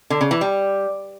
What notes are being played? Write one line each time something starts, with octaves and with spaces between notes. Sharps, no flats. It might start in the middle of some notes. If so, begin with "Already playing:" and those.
D3
C#3
E3
G3